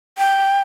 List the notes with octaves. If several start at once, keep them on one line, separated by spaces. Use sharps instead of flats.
G5